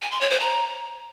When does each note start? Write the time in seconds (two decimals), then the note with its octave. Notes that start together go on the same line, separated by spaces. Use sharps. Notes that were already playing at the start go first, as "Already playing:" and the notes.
0.02 G#5
0.11 C6
0.21 C#5
0.30 C5
0.40 A#5